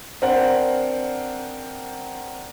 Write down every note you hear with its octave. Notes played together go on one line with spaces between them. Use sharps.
C4 D4 A#4 C5 F#5